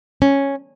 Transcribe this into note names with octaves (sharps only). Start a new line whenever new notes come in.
C#4